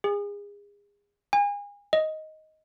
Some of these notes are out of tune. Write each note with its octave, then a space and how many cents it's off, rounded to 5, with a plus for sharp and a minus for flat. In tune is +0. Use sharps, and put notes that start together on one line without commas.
G#4 -30
G#5 -35
D#5 +10